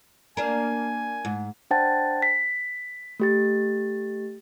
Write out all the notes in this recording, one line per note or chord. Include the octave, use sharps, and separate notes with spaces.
A#3 D4 A#4 G#5
G#2
D4 C5 F#5 G5 A5 A6
B6
A3 G4 A6